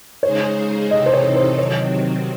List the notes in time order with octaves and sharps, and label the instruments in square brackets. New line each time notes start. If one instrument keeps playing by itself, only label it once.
[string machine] C#3 G#3 D#4 G#4 C5 [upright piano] C#5
[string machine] C3 E3 C4 D#4 A4 [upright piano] D#5
[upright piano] C5
C#5
C5
[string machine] C3 D#3 F#3 C4 [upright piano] C#5